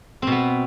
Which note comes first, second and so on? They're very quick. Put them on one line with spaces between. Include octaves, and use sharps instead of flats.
C4 B2 B3